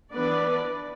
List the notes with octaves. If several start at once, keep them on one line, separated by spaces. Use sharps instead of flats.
E3 B3 D4 B4 D5